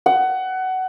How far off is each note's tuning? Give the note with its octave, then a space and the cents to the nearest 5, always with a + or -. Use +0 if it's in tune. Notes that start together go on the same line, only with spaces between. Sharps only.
F#5 +20